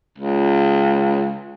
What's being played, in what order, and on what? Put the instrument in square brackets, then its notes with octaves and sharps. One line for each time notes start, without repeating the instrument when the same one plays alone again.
[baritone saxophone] C#2